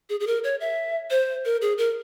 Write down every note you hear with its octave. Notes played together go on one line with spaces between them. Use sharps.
G#4
G#4
A#4
C#5
E5
C5
A#4
G#4
A#4